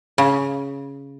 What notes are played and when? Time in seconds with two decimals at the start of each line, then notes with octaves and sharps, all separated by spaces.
0.18 C#3